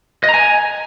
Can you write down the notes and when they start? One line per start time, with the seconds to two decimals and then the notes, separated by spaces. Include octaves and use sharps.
0.24 D#5
0.29 A#5
0.34 G#5